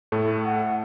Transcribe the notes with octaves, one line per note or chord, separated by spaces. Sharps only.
A2 A3
F#5